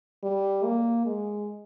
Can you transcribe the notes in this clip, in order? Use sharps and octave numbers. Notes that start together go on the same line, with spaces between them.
G3
A#3
G#3